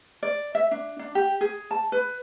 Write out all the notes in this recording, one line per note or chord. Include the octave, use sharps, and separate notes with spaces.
D5
E5
D4
D4
G4
G#4
A5
B4